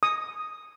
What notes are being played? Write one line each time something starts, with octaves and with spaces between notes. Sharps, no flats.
D#6